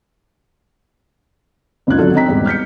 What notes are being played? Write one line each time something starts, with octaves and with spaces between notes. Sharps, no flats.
F#1 C#2 D#4 F4 F#6 G#6
G#1 D3 F#3 A4
C4 D#5 G5 A#5 B6
E2 G#2 G3 C4
F6 G6 B6 C#7